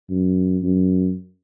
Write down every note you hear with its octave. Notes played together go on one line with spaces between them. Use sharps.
F#2
F#2